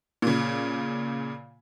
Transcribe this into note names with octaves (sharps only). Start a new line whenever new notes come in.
A#2 C#3